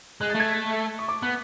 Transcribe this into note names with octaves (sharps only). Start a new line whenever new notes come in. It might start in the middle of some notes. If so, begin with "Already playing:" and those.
G#3 F#6
A6
A3 G#6
C#6
D6
B3 F#6